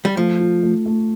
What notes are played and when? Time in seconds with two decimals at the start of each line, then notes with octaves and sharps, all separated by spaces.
0.05 G3
0.17 F3 A3
0.40 F4
0.63 A3
0.86 A3